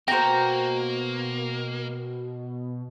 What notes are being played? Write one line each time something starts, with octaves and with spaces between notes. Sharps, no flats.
B2 A#3 F#4 C5 G5 A#5